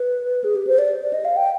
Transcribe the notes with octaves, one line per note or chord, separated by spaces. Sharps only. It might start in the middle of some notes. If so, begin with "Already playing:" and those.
Already playing: B4
G#4
G4
C5
D5
D5
D#5
F5
G5